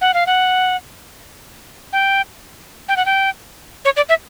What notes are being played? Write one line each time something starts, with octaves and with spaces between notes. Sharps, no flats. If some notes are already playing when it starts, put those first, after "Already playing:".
F#5
F5
F#5
G5
G5
F#5
G5
C#5
D5
E5